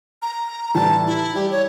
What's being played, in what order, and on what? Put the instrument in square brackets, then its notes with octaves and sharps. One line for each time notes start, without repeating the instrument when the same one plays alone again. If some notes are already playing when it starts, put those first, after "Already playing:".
[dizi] A#5
[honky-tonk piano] A2 E3 G3 [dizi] A5
[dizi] E4
[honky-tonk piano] G3 [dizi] G4
[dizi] C#5